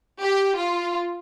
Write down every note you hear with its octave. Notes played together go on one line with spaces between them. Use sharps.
G4
F4